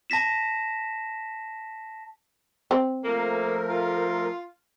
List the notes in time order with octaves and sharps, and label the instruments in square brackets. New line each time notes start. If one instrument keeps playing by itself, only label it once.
[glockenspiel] A5 A#6 B6 E7
[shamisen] C4
[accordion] F3 A3 A#4 [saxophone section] A#3
[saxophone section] F4